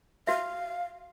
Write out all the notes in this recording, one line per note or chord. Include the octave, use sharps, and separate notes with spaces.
F#4 E5 F5